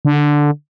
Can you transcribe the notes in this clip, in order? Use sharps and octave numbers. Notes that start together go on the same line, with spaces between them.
D3